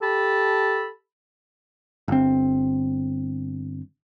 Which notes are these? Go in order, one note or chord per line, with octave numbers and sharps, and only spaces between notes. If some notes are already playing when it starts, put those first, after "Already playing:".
G4 A4 A5 B5
G1 C4